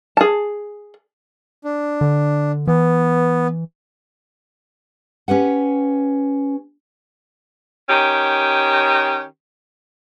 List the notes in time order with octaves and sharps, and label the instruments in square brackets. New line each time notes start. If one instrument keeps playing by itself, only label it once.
[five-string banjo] G#4 A5
[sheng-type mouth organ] D4
[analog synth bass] D3
[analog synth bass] E3 [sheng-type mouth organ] B3
[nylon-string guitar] C#4 G4 B4 F#5
[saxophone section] D#3 C#4 G4